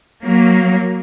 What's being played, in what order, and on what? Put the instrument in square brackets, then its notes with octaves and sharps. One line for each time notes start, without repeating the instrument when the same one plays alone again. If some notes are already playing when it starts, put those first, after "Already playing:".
[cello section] F#3 A#3